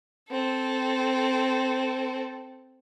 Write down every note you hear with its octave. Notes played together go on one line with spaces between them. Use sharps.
C4 A4